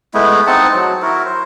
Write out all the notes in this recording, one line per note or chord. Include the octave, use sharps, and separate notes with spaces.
G#3 A3 B3 E4
C4 D#4 F#5 A5
F#3
E4 F#4 A#4
C5